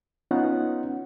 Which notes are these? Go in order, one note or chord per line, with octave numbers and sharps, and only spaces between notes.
B3 C#4 D#4 F4 F#5